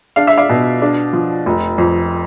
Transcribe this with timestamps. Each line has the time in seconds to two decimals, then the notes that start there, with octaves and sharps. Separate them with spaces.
0.16 D4 F5
0.27 E5
0.37 D5 F5
0.50 B2
0.82 D4
1.13 F3
1.46 F1
1.78 F2